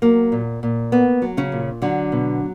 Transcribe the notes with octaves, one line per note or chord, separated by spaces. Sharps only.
F#3 A#3
A#2
A#2
A#3 B3
F#3
C#3 C#4
A#2
D3 F#3 D4
B2